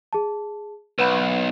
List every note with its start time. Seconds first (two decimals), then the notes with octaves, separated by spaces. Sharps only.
0.13 G#4 A5
0.99 B1 B4 F#5 B5